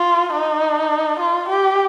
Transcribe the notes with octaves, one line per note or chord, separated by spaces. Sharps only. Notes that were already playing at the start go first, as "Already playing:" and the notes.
Already playing: F4
D#4
F4
G4